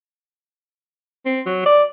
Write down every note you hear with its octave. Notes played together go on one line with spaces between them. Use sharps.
C4
F#3
D5